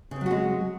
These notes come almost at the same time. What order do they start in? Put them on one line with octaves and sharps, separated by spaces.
C#3 C4 F#3 F#4 G#3